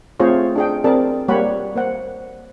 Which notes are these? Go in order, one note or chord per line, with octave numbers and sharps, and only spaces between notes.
A3 C4 F4 G#4 C5 C#5
D4 G#4 G5
C4 G#4 A#4 D5 A5
G3 A#3 G4 C#5 F#5 B5
A#3 C5 F#5